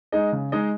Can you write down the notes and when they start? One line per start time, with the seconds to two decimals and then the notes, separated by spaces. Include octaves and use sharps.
0.12 G#3 D#4 G#4 D#5
0.32 C#3
0.52 G#3 D#4 G#4 D#5